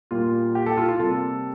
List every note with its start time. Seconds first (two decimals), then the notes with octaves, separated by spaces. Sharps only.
0.11 A#2 G3 A#3 F4
0.55 G4
0.66 A4
0.77 F4
0.89 F4
1.00 C3 G3 A#3 A4